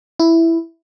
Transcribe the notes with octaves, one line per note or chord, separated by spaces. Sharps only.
E4